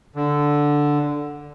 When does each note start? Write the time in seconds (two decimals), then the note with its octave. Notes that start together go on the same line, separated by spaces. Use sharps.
0.16 D3